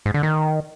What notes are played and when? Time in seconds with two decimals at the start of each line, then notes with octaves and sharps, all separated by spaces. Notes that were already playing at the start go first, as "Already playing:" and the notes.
0.06 G#2
0.14 D3
0.23 D#3